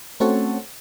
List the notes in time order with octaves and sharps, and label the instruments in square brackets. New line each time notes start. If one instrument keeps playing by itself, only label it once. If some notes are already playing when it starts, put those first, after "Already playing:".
[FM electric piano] A3 C4 C#4 F#4 A4 C#5